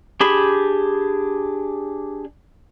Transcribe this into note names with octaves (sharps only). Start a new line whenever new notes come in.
D4 G4 G#4 B5